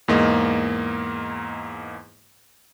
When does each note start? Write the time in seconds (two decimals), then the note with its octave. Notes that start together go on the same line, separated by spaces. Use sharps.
0.08 E2 G#2 A#3 D#5